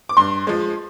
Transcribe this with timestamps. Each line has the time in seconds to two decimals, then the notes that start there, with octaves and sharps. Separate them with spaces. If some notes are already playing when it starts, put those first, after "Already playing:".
0.09 D6
0.17 G2 C6
0.47 F3 G#3